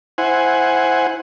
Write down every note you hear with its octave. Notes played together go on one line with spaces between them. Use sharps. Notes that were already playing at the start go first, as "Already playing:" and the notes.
E4 C5 F#5 G#5